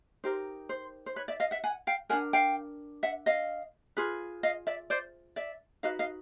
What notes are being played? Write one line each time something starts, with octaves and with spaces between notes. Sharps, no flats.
D#4 G4 A#4 C5
C5
C5
B4 C#5
D5 E5
D#5 F5
E5 F#5
F#5 G#5
F5 G5
D4 F#4 A#4 F#5 G#5
F5 G5
E5 F#5
D#5 F5
F4 G#4 B4
D#5 F5
D5 E5
C5 D5
D5 E5
D#4 F#4 B4 D#5 F5
D#5 F5